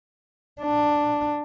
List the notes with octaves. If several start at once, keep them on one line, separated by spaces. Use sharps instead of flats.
D4